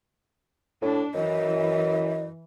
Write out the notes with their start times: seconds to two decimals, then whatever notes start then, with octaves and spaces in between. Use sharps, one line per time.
0.82 A2 D4
1.14 F#2 E3 D#5